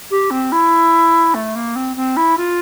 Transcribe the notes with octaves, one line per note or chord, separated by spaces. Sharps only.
G4
C4
E4
A3
A#3
C4
C4
E4
F4